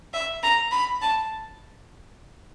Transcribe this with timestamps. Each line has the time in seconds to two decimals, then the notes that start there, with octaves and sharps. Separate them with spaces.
0.14 E5
0.43 A#5
0.71 B5
1.02 A5